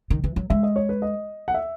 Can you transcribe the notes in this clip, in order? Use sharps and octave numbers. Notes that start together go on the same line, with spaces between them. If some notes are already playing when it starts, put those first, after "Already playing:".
D#3
E3
F#3
G#3 E5
D#5
C#5
B4
D#5
F#5
E5